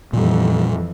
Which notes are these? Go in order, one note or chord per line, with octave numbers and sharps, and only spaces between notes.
F2 A#2 E3 G3